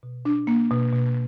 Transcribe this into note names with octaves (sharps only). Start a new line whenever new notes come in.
B2
D4
A#3
B2
B2